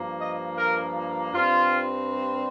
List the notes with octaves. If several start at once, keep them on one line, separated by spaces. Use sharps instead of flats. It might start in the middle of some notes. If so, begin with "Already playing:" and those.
Already playing: G2 F3 A#3
D#5
A#4
G2 G3 C4 F4